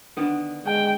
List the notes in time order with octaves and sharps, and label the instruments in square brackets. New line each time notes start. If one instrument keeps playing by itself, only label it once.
[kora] D3 D#3 B3
[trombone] G#3 [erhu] G5